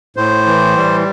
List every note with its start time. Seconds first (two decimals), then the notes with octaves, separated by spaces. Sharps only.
0.17 A2 C5
0.46 E3
0.76 G3